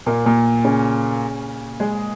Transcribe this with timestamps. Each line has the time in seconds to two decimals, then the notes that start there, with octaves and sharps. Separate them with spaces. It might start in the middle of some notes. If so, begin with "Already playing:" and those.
0.06 A#2 A#3
0.26 A#2 A#3
0.64 C#3 C#4
1.80 G#3 G#4